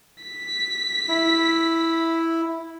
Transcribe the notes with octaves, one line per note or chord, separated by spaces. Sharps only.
B6
E4